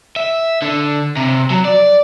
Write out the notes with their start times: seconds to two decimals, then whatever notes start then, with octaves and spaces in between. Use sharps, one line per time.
0.16 E5
0.62 D3
1.17 C3
1.50 F#3
1.65 D5